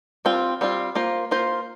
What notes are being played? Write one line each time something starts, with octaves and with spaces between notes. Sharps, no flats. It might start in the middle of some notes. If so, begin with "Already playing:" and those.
G3 C4 F4
G3 C4 F4
A#3 F4 C5
A#3 F4 C5